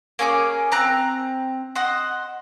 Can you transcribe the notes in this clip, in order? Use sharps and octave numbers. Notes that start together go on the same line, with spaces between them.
A#3 C#4 G#4 D6
C4 A#5 F#6
C5 D#5 F#5